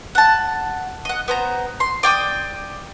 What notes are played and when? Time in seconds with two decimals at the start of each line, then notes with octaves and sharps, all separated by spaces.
0.15 F#5 A5
1.05 D#5 F#5
1.28 B3 C5 A#5
1.80 C6
2.03 D5 G5 D6 D#6